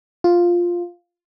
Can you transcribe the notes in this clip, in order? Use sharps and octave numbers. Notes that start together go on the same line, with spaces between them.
F4